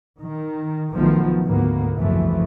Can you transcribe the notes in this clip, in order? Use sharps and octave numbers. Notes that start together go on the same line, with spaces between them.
D#3
B1 D#3 F3 A3 B3
D2 G#2 A#3 B3
F#1 C2 E3 F3 A3